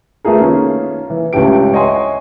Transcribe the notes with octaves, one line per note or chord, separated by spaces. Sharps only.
A3 B3 F4 G#4 A#4
D#3 A#3 C#4 F4
E3
C#2 G2 A3 C#4 G4 D7
C#5 D#5 E5 F#5 G#5 C6